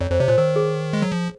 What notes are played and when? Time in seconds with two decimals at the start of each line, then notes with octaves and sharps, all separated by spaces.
0.01 F2 C#5
0.11 F2 C5
0.20 C3 C#5
0.28 A#2 C5
0.38 D#3 A#4
0.56 G#4
0.93 G#3
1.02 F#3
1.12 F3